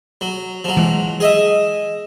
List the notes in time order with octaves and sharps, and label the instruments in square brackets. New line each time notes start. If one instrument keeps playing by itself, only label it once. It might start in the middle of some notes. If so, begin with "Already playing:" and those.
[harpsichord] F#3
F3 F#3
[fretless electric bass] E3 G#3
[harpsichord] G#4 D#5 E5